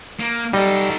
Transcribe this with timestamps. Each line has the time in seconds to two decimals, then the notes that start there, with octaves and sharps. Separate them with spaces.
0.20 A#3
0.53 G3 D#4 A4